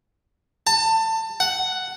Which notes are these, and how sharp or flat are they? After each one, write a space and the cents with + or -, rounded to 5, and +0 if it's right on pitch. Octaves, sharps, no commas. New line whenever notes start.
A5 +25
F#5 +5